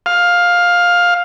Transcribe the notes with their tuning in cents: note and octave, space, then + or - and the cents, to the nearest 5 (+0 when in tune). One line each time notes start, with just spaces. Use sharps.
F5 +10